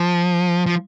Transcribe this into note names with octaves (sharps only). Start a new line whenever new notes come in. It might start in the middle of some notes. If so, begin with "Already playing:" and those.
Already playing: F3
F3